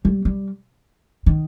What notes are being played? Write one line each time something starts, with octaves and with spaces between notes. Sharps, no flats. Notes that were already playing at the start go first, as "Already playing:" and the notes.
G3
G3
D#3